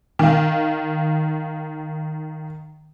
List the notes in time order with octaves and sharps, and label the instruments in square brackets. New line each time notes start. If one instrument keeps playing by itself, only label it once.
[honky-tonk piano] D#3 F5